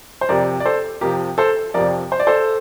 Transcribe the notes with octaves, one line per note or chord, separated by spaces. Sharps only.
C5
F2 C3 F3 A#4 D5
D5
A4 C5
F2 C3 F3 G4 A#4
A4 C5
F2 C3 F3 A#4 D5
C5
D5
A4 C5